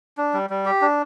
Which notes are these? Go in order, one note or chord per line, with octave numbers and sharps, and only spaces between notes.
D4
G3
G3
G4
D4